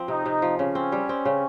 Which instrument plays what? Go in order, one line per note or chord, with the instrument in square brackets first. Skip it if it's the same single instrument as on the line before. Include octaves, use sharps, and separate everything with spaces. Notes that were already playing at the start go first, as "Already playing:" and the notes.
Already playing: [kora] F3 C4
[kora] C3 [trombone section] D#4
[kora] C3
F3
[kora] C#3 [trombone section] C#4
[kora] C4
G3
C4
C#3